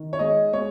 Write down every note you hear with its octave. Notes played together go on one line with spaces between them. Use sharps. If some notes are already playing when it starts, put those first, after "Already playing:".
Already playing: D#3
C#5
G#3 D#5
G#3 C#5